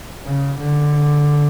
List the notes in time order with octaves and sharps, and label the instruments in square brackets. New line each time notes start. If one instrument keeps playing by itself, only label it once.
[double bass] C#3
D3